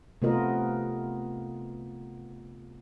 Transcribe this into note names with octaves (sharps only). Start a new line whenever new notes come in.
C3 A3 B3 F4 A#4 D#5